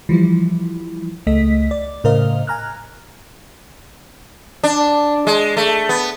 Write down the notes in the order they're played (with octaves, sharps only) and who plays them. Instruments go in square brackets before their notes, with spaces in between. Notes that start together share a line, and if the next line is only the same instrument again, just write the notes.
[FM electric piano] E3 F3 G3 E4
C#2 A3 D#5 B6
D5
A2 C#3 A#4 C5 D#5 F5
G#5 A#5 F6 F#6
[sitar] D4
G#3
A3
B3